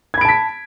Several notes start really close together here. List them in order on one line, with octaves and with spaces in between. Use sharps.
G#6 B5 D7 A5 B6